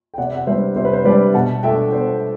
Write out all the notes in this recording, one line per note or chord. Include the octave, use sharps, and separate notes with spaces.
G5
C3 D5 F#5
F#5
G3 B3 D4 C5 E5
C3 C5
B4
C5
G3 B3 D4 B4 D5
B2 F#5 A5
A3 D4 E5 G5
B2 C5